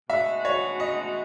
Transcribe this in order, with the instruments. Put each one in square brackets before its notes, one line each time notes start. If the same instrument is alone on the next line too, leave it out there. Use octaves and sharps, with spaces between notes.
[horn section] B2 G#3 D#4 F#4 [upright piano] E5
[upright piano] C#5
D#5